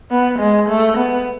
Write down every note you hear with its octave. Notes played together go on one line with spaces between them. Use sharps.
B3
G#3
A3
B3